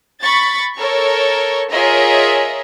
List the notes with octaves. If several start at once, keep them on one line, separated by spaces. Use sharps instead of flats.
B5 C#6 A6
A4 A#4 C#5 C#6
F4 G#4 A#4 C#5 D#5 E5